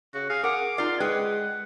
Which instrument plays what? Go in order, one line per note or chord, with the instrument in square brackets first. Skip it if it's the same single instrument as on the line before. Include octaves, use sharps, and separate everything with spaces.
[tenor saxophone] C#3 [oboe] F#4
[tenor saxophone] G#4 [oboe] F5
[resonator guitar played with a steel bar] A#4 F#5 [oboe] D6
[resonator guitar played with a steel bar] D#4 D5 [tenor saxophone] F4 [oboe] F5
[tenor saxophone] G#3 [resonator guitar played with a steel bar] G#4 B4 G5 [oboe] F#5